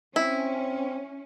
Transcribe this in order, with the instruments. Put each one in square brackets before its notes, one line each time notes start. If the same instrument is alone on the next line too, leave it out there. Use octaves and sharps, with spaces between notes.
[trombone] C4 [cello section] C#4 [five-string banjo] E4